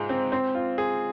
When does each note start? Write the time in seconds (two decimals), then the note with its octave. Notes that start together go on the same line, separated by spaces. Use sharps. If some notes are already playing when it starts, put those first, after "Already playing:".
Already playing: G#2 G#3 F4
0.09 C4
0.32 C4
0.55 F4
0.78 G#4